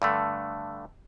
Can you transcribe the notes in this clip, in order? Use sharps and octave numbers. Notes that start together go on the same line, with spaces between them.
G2 D3 A3